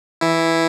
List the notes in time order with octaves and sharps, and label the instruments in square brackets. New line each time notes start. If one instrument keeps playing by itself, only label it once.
[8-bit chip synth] E3 E4